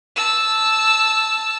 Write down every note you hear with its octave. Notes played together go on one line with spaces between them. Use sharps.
A5 E6